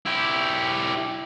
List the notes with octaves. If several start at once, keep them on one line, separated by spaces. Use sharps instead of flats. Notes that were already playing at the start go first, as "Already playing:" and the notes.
E4 G4